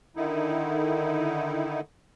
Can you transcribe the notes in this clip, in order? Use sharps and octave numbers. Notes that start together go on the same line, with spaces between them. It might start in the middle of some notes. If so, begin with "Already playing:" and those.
D3 D#3 D#4 E4